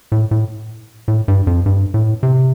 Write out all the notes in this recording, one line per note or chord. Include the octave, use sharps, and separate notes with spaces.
A2
A2
A2
G2
F2
G2
A2
C3